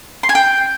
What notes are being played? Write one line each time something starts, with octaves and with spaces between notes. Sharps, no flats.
C6
G#5
G5